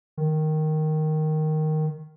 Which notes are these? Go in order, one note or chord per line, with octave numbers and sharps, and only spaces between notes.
D#3